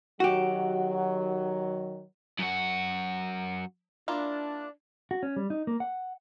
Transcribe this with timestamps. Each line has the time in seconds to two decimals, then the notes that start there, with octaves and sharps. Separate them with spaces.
0.20 D#3 F#3 F#4 G4
2.39 F#2 F#4
4.08 A#3 D4 E4 F4
5.11 F#4
5.23 C#4
5.36 G3
5.50 D#4
5.67 A#3
5.80 F#5